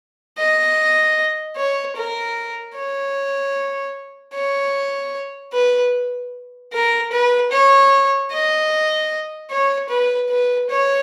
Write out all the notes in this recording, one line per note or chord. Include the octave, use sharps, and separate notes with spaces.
D#5
C#5
A#4
C#5
C#5
B4
A#4
B4
C#5
D#5
C#5
B4
B4
C#5